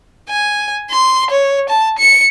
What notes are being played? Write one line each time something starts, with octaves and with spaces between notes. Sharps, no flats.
G#5
C6
C#5
A5
C#7